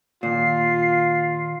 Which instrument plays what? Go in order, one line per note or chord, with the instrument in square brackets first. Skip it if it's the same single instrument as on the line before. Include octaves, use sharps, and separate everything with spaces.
[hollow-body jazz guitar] D#2 A#2 [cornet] F4 [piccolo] C7